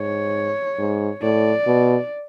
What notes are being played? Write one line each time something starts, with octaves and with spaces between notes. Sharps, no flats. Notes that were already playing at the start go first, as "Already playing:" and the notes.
Already playing: G#2 C#5
G#2
A2 D5
B2